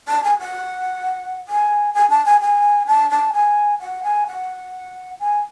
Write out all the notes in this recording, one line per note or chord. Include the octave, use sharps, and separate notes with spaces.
A5
G#5
F#5
G#5
G#5
A5
G#5
G#5
A5
A5
G#5
F#5
G#5
F#5
G#5